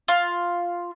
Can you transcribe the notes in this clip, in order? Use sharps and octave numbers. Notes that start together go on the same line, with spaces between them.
F4